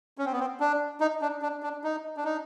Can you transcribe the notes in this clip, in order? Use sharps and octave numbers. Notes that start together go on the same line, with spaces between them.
C#4
C4
B3
C4
D4
D#4
D4
D4
D4
D#4
D4
D#4